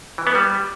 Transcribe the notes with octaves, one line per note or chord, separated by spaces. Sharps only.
E3
B3
G3